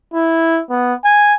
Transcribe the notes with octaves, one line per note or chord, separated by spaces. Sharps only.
E4
B3
G#5